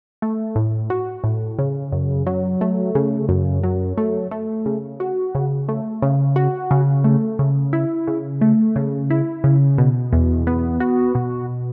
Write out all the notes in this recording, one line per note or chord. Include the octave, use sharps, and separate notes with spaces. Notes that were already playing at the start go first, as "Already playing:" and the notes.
A3
A2
F#4
A2
C#3
F#2
F#3
A3
C#3
F#2
F#3
A3
A3
C#3
F#4
C#3
A3
C#3
F#4
C#3
A3
C#3
E4
C#3
A3
C#3
E4
C#3
B2
E2
B3
F#4
B2